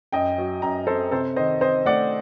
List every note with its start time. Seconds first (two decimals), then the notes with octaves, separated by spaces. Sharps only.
0.12 F#2 D#5 G5
0.38 F#3
0.62 F#2 G5 A#5
0.87 C4 A4 C5
1.11 C3 A4 C5
1.36 D#3 C5 D#5
1.61 C4 C5 D#5
1.85 A3 D5 F#5